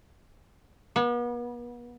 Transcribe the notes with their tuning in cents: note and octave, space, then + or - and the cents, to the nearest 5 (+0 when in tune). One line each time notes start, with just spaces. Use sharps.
B3 -40